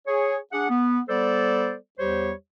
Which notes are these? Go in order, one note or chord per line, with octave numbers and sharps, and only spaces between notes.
G#4 C#5
D4 G#4 F#5
B3
G3 B3 A4 C5 D5
E2 G3 G4 C5 C#5